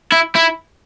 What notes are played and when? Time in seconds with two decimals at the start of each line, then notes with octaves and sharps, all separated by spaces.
0.12 E4
0.35 E4